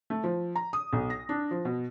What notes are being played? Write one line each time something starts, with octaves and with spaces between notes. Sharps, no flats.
A3
F3
A#5
D#6
B1
A#6
D4
F3
B2